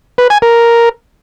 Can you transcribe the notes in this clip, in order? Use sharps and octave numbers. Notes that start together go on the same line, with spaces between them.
B4
G#5
A#4